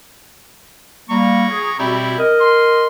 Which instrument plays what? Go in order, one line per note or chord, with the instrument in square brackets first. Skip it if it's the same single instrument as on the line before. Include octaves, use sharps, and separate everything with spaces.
[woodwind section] G3 A#3 [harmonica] A#5 C#6
[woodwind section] G#4
[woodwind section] B2 C4 [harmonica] G3 E4
[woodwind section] A#4 D#5
[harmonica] C6